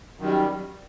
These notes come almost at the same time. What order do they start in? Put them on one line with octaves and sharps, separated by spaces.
F#2 D#3 G3